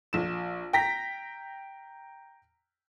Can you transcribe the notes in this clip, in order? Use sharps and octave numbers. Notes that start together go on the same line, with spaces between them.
A#1 E7
G5 A#5 A#6 B6